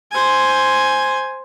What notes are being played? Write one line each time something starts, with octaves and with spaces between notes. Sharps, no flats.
C5 G#5